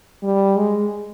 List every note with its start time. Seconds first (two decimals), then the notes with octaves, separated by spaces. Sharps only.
0.23 G3
0.57 G#3